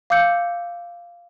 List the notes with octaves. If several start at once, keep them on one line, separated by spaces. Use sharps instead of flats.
F5 D6 E6 G6 C#7